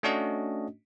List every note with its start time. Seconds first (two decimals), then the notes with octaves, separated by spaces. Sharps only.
0.03 A3 C#4 D4 F#4 D#5